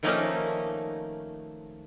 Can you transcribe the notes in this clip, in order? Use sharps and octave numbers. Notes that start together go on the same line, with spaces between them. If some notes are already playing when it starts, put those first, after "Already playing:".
D#3 F3 A3 A#3 C#4 D#4